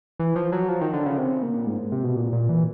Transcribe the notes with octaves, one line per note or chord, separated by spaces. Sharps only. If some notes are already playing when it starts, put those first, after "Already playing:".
E3
F3
F#3
F3
D#3
D3
C#3
C3
A#2
G#2
C3
B2
A#2
A#2
E3